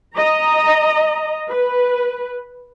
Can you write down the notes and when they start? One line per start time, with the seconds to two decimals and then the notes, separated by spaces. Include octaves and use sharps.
0.16 D#5 A#5
1.48 B4